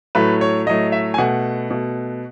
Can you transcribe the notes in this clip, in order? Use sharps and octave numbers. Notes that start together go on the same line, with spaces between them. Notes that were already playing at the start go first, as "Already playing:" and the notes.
A2 F#3 A3 B4
C#5
A2 F#3 A3 D#5
E5
G#5
B2 A3 F#5
B2 A3